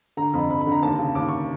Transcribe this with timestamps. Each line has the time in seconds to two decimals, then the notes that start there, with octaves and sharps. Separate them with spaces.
0.17 D3 A#5
0.33 F2 B5
0.50 F2 B5
0.61 B5
0.67 D3
0.72 A#5
0.83 D#2 A5
0.99 C#3
1.15 D#2 D6
1.28 C#6